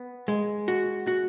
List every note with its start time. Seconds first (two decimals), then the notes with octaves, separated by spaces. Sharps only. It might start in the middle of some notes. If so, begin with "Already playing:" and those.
Already playing: B3
0.28 G#3
0.68 F#4
1.07 F#4